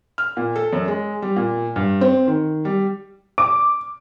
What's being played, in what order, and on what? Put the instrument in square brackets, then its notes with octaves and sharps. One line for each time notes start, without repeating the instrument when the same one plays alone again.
[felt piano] F6
A#2
A4
F#2
G#3
G3
A#2
G2
C4
D#3
G3
[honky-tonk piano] D6